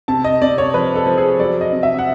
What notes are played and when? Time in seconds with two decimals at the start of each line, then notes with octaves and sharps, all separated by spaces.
0.08 C3 A5
0.24 D#5
0.42 C3 D5
0.58 C#5
0.74 F3 B4
0.96 A4
1.06 F3
1.18 G#4
1.39 F#3 D5
1.61 D#5
1.72 C3
1.83 E5
1.99 F#5